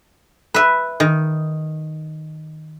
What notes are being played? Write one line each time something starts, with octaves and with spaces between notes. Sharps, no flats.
B4 E5
D#3